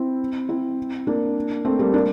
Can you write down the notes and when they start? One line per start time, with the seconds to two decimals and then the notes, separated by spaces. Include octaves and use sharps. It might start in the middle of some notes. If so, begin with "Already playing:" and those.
Already playing: C4 E4
0.49 C4 E4
1.07 A#3 D4
1.65 A3 C4
1.79 G3 A#3
1.94 A#3 D4